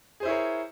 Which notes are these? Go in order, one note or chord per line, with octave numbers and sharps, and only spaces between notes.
E4 G#4 A#4 C5 C#5